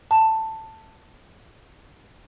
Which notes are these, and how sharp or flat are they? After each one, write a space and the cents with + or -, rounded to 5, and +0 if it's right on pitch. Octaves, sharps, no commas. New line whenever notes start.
A5 +10